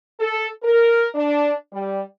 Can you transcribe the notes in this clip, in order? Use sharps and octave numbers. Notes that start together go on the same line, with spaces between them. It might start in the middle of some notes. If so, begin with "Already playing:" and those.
A4
A#4
D4
G3